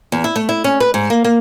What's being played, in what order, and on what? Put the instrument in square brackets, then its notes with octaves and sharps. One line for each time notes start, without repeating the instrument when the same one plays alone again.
[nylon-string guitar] E2
E4
A3
E4
C#4
B4
G#2
A#3
A#3